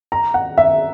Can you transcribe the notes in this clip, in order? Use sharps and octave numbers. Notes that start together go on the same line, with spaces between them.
A#5
F#5
E5